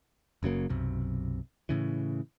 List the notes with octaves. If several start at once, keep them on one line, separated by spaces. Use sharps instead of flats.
F#1 C#3 F#3 A#3
B1 F#2 C3
A2 C#3 E3